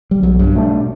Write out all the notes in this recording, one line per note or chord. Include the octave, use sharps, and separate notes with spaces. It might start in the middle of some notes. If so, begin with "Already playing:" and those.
G3
B1 F#3
G2
B2 A3 D4